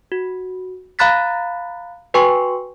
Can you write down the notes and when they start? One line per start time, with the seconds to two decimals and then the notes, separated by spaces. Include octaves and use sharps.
0.12 F#4
0.99 F5 A#5 B5 F#6 A6 B6
2.14 F#4 B4 G5 G#5 C6 C#6